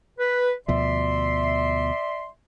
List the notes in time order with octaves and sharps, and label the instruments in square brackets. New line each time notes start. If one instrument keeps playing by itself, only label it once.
[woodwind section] B4
[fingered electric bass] D2 B2 F3 [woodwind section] D5 E5 C6